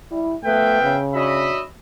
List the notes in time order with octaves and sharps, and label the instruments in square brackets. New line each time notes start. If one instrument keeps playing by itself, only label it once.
[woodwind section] G3 [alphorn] E4
[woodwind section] F3 B3 B4 [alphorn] A3 [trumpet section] E5 F5 G5
[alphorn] C#3
[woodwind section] D4 F#4 C#5 [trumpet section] D#5 E5 B5